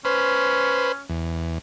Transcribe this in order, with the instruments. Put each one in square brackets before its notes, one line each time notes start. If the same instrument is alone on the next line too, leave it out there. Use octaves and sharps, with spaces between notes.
[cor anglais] C#4 [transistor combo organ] B4 C5
[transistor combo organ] E2